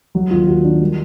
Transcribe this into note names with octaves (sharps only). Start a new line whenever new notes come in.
F#3 F#4
D#2 F4
D#2 F#4
D#3 D4
G3